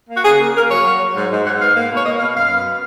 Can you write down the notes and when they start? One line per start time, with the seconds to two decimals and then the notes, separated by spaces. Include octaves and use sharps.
0.09 A#3
0.16 F#4
0.23 C#3 G#4
0.38 A#3
0.55 A#3 A#4
0.69 F#3 C#5
0.84 F#3
0.99 F#3
1.14 G#2
1.29 G#2
1.44 G#2 F#5
1.59 B3 F5
1.75 A#3
1.90 B2 C#5
2.04 A#3 D#5
2.19 B2 F5
2.35 F#2 F5
2.49 B3